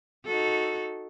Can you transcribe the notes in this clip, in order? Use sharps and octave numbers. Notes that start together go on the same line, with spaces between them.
D#4 F#4 A4